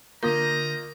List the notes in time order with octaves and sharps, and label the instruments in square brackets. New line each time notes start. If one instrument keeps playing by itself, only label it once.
[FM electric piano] D3 D#6 G6 [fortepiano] A#3 F4 [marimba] A#4 [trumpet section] D#5 A#5